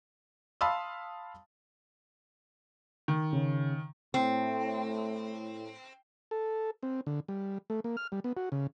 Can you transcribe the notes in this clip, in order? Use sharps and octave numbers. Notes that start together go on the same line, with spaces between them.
F5 A5 B5 C6 D#6 E6
D#3
C#3
A2 C4
A4
C4
D3
G3
A3
A#3
F6
G3
B3
F#4
C#3